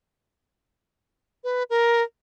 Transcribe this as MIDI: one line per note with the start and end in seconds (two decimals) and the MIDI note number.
1.44 1.63 71
1.70 2.02 70